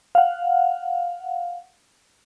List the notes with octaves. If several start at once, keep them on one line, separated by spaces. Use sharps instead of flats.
F5 F#5